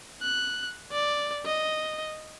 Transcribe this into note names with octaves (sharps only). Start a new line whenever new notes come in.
F#6
D5
D#5